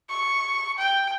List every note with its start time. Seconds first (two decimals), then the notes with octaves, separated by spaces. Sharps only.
0.09 C#6
0.78 G5